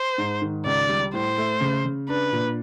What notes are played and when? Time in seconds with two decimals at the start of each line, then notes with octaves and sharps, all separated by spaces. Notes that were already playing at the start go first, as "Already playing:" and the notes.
Already playing: C5
0.18 G#2
0.42 D#3
0.66 C#2 D5
0.89 G3
1.13 A2 C5
1.38 A3
1.61 C#3
1.85 C#3
2.09 D4 B4
2.33 A#2